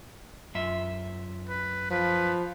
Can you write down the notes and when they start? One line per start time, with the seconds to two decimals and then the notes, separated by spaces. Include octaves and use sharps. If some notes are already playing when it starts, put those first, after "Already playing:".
0.55 F#2 F4 E5
1.49 B4
1.90 F3 B4